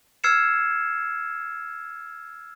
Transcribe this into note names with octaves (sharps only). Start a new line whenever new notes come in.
E6 F6 G#6 C7 C#7 E7